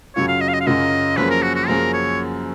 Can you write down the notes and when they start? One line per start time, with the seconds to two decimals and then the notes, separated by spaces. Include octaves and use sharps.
0.16 F#2 C#3 F#3 C#4 F4 C#5
0.28 F5
0.41 D#5
0.49 F5
0.54 D#5
0.61 F5
0.66 F#2 C#3 F#3 C#4 F4 D#5
1.17 F#2 F3 A#3 C#4 G#4 B4
1.30 A#4
1.43 F#4
1.55 F#4
1.68 F#2 F3 A#3 C#4 G#4 A#4
1.93 C#5